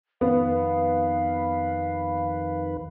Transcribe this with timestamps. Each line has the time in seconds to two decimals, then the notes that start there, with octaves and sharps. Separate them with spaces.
0.21 F2 D#3 B3 B4 F5